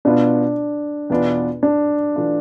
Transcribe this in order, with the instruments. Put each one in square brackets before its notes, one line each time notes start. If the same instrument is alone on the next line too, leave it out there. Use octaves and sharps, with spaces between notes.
[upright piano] B2 B3 F4 [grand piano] D4
[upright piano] E2 B2 B3 D4 F4
[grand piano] D4
[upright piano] E3 A3 D4 F4